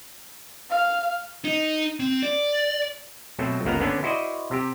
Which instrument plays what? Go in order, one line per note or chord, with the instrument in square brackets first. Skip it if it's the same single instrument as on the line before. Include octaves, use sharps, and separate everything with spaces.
[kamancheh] F5
[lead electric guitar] D#4
C4
D5
[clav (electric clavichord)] B2 F#3 A3 C4
G1 C#2 A#3 B3 A#5
D3 B3 C#4 D4
E4 F#4 C5 D5 D#5
C3 G4